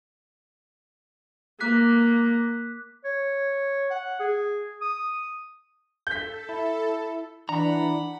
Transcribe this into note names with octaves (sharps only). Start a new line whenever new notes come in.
A#3 D6 F#6 B6
C#5
F#5
G#4
D#6
A4 G6 B6
E4
E3 D4 F#5 A#5 B5